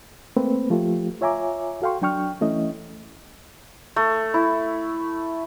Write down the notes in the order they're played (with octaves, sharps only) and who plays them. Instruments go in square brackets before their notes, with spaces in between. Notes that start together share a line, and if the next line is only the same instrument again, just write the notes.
[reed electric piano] A3 A#3 C4 B4
F3 A3 F4 G4
F4 C#5 E5 G#5 A#5 D6
F#4 A4 F5 G5 C6 C#6
F#3 D4 G5 C#6 F6
E3 A3 C#4 E4 D#5
[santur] A3
E4